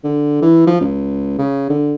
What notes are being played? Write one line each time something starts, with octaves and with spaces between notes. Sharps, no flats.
D3
E3
F3
C#2
C#3
D3